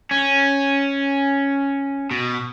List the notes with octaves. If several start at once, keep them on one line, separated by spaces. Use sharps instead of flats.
C#4
B2